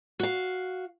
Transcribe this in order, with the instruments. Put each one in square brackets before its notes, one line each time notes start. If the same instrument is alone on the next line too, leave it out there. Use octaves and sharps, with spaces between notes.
[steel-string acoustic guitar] F#4 F5